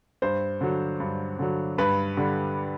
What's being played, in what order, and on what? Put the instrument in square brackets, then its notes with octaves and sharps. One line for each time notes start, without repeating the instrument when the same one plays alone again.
[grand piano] G2 C5
D3 F#3
G2
D3 F#3
G2 B4
D3 G3